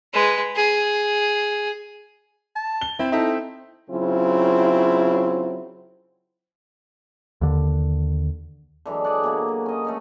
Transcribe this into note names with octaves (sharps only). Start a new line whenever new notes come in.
G#3 B4
G#4
A5
G7
C4 E4
D#4 E4 A4 E5
C#3 F#3 C4 E4 F4
D#2 D3
D3 E3 F#3 G#3
G#4 D5 F#5
B2 A#3 C#5
F#3
C#4 D#5
A3 C#4 D#5